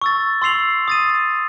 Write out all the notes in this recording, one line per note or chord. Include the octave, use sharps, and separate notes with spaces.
C#6 E6 A6
C6 E6 C7 F7 F#7
D#6 A6 D#7